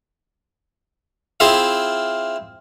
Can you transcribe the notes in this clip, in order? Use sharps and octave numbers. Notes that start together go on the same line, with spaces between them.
C4 E4 F4 G#4 E5 F5